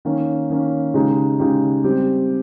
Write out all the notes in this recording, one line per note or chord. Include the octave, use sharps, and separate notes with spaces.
D#3 A#3 C#4
D#3 A#3 C#4
C#3 G#3 D#4 G4
C#3 G#3 D#4 G4
G3 C4 G4